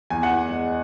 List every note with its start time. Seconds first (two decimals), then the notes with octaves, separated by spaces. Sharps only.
0.10 E2 G#5
0.23 F#5
0.31 E2
0.50 G#3